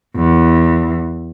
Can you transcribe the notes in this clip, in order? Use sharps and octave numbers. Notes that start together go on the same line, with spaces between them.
E2